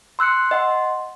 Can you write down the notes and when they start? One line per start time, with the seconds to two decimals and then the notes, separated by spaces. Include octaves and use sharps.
0.19 C6 E6 F#6 C7 C#7
0.51 D#5 F#5 C6